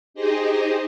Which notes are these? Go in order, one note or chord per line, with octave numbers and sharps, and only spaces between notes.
D#4 G4 G#4 C5 D#5